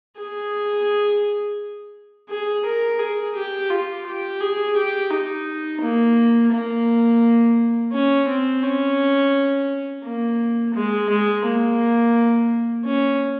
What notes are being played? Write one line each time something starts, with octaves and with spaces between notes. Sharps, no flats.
G#4
G#4
A#4
G#4
G4
F4
G4
G#4
G4
D#4
A#3
A#3
C#4
C4
C#4
A#3
G#3
G#3
A#3
C#4